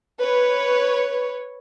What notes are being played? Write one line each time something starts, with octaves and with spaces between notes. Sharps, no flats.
B4 C#5